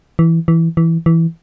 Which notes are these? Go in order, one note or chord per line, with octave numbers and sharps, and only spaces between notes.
E3
E3
E3
E3